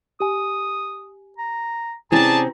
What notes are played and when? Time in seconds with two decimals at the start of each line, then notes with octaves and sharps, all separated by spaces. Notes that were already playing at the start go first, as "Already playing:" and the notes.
0.20 G4 G#5 D#6
1.38 A#5
2.12 C3 C4 C#4 E4 G#4 D5 A5 A#5